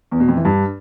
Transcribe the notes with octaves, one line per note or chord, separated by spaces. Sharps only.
E2
B2
F2
E3
G2